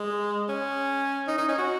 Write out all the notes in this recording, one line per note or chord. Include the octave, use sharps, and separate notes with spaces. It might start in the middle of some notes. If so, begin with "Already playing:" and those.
Already playing: G#3
C#4
D#4
D#4
C#4
F#4